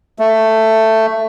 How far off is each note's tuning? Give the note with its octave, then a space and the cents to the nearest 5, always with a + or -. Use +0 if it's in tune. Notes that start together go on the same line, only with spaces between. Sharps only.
A3 +10